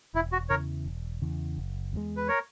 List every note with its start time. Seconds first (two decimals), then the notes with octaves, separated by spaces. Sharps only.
0.14 E1 E4
0.32 F#4
0.50 E2 C#3 E3 A#4 C#5
0.85 E1
1.21 E2 C#3 E3
1.57 F#1
1.93 E2 B2 G#3
2.17 B4
2.28 A#4 C#5